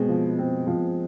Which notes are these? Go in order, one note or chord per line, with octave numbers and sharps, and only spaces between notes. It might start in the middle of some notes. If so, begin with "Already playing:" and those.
Already playing: B2 G#3 C4
F3
C4
F3